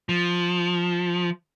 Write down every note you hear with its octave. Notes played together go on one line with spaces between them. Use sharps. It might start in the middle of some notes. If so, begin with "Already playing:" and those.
F3